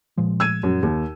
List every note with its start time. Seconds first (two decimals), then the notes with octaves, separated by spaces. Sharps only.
0.17 A#2 F3 G#3
0.40 E6 G#6 D#7
0.63 F#2
0.83 D#2